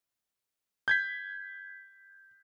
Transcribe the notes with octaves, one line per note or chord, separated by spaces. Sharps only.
G6 G#6 B6